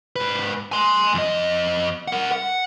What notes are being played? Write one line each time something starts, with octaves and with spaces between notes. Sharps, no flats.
G#2 B4
G#5 C6
F2 D#5
A#4 F#5
F#5